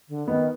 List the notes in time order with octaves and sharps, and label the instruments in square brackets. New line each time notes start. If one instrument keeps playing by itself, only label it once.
[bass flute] D3
[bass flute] D#3 [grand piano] B3